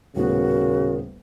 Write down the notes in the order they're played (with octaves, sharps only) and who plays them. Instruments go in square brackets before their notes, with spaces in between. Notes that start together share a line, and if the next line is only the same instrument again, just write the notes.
[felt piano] D#1 A2 B3 [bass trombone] C#3 [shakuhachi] F#4 [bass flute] A#4